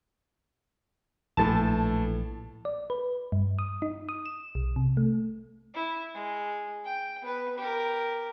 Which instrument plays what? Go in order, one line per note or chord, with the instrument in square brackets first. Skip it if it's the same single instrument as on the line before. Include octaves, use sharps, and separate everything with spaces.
[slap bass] A#1 [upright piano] A2 E3 [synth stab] A5
[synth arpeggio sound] D5
B4
G2
D#6
D#4
D#6
E7
B1
C3
A3
[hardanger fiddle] E4
G#3
G5
B3 B4
G4 A#4